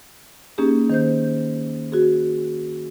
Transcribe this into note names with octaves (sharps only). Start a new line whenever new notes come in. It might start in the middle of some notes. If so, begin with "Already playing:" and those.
A#3 C#4 D#4 G4 G#4
D#3 C5 G6
F#4 G#4